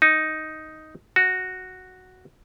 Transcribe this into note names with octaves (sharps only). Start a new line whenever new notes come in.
D#4
F#4